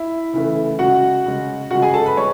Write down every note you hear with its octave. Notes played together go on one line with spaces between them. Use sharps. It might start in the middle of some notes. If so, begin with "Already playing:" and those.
Already playing: E4 E5
C#3 E3 A3
C#3 G#3 F#4 F#5
C#3 G#3
C#3 G#3 F#4 F#5
G#4 G#5
A4 A5
B4 B5
G#3 C#5 C#6